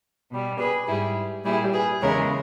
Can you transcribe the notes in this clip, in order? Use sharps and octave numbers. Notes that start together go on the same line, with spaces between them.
B2 G3
G#4 B4
G#2 G3 E4 G#4
A#2 G3 E4 G#4
G#4 B4
E2 C#3 E3 G#3 A#4 C#5